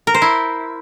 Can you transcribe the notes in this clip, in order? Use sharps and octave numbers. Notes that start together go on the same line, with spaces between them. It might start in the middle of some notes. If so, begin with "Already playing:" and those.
A#4
C5
E4